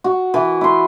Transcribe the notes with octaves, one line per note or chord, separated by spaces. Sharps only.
F#4
E3
E4 C6